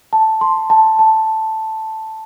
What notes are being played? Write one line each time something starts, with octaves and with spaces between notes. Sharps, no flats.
A5
C6
A5
A5